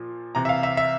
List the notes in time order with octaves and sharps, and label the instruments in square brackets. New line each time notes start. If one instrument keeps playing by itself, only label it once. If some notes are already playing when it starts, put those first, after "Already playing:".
Already playing: [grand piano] A#2 F3
C3 E3 A#5
E5
F5
E5
E5